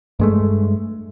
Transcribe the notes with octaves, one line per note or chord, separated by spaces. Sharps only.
G2 G#3 A3